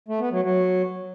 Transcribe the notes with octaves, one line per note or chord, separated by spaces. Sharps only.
A3
B3
F#3
F#3